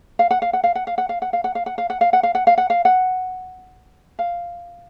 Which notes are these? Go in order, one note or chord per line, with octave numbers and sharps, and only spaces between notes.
F5
F#5
F5
F#5
F5
F#5
F5
F#5
F5
F#5
F5
F#5
F5
F#5
F5
F#5
F5
F#5
F5
F#5
F5
F#5
F5
F#5
F5